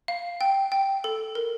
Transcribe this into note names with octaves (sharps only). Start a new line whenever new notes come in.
F5
G5
G5
A4
A#4